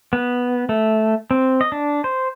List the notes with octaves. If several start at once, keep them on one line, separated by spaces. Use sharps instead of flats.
B3
A3
C4
D#5
D4
C5